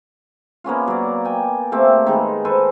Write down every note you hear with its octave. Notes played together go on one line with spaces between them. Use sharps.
A#3 B3 C#4 F4
F#3 D5
G5 G#5
A3 A#3 C4 G4
D#3 G#3 B4
A4 B4 C5 G#5